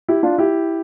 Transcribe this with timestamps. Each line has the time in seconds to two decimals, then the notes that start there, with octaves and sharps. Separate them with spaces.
0.08 E4 G4
0.23 D4 F4
0.38 E4 G4